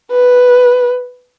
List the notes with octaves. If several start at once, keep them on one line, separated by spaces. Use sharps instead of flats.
B4